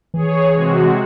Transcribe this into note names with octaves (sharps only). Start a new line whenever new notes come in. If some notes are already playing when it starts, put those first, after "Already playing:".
E3 G#4 C#5
C3 G#3 F#4